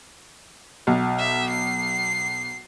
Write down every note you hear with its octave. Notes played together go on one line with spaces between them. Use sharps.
B1
E5
C7